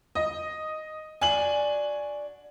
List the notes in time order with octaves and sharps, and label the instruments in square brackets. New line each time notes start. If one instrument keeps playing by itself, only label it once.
[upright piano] D#5
[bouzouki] D4 F#4 [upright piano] G#5 F#7